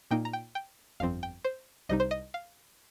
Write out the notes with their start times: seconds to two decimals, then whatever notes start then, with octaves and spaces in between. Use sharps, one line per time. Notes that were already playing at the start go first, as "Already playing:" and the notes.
0.11 A#2 A#3 D#4 G5
0.25 A#5
0.33 G5
0.55 G5
1.00 G1 F2 F3 C4 F5
1.23 G5
1.44 C5
1.89 C2 C3 G3 D#4 D#5
2.00 C5
2.11 D#5
2.34 F5